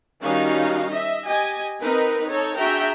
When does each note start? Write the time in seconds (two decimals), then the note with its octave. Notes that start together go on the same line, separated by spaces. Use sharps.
0.22 D#3 G3 C#4 D#4 F#4 F5
0.89 D#5 E5
1.24 G4 D#5 G#5
1.81 C4 D#4 A#4 B4
2.29 D#4 A4 C#5
2.57 D4 F#4 G#4 E5 G5 A#5